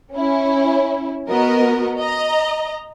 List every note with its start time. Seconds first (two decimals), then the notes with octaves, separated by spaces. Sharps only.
0.14 C#4 E4
1.29 B3 F#4 A#4 D#5
1.99 D#5 A#5